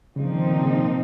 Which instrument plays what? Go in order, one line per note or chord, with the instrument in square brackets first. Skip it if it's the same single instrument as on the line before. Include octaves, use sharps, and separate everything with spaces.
[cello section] A#2 F3 C4 D#4 [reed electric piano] C#3
[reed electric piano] D#3
D#3
C#3
C3